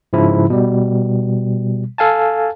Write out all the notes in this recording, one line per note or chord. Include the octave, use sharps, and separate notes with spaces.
G#2 C#3 F3 E4
B2 G3
A4 F5 G#5 A5